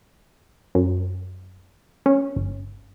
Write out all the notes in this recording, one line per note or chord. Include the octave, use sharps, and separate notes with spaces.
F#2
C#4
G1